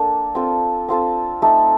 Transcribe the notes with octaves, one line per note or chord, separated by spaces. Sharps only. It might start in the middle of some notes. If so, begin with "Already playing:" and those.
Already playing: A#3 D4 A4
C4 F4 A4
C4 F4 A4
A3 D#4 A4